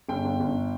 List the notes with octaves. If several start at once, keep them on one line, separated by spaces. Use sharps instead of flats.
G1 G5
G1
G1